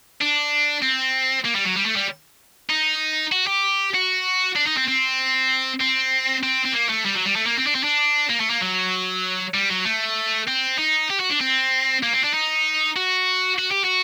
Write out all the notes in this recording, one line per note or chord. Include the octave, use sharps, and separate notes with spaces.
D4
C4
A#3
G3
F#3
G3
A3
G3
D#4
F#4
G4
F#4
D4
D#4
C4
C4
C4
C4
C4
A#3
A3
G3
F#3
G3
A3
A#3
C4
D4
C4
D4
A#3
A3
A#3
F#3
G3
F#3
A3
C4
D#4
G4
F#4
D4
C4
A#3
C4
D4
D#4
F#4
F#4
G4
F#4